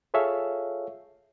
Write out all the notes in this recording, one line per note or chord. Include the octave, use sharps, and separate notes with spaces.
F4 G#4 A4 C#5 E5 F5